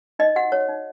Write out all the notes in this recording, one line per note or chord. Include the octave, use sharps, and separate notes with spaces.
D#4 D#5
F#4 F#5
F#4 C#5
D#4